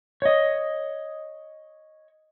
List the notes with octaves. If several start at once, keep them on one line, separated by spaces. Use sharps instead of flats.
C#5 D#5